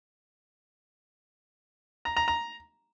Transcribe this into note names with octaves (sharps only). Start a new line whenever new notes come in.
A#5
A#5
A#5